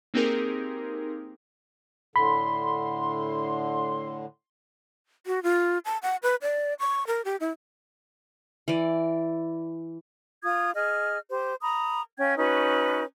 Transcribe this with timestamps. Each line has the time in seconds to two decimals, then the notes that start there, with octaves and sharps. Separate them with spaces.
0.14 A#3 C4 D#4 G4 G#4 A#4
2.16 A2 D3 B5 C6
5.27 F#4
5.43 F4
5.85 A5
6.02 F#5
6.23 B4
6.42 D5
6.79 C#6
7.07 A#4
7.25 G4
7.40 E4
8.68 E3 D5
10.44 F4 D#6 G#6
10.75 G#4 D#5 F6
11.31 G4 C5
11.61 A#5 B5 D#6
12.19 C#4 F5 G5 G#6
12.38 C#4 D#4 F#4 B4